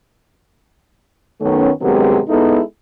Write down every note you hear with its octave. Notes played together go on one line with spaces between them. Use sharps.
F#2 D#3 A3 B3 C#4
G2 C3 D#3 F#3 G#3 B3
G#3 B3 D#4 E4 A4